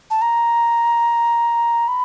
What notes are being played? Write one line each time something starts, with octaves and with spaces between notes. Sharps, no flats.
A5
A#5
B5